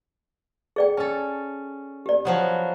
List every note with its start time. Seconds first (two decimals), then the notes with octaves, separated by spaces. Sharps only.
0.76 G#4 D5 G5
0.97 C#4 A4 G5
2.06 G4 D5
2.25 F3 F#3 B3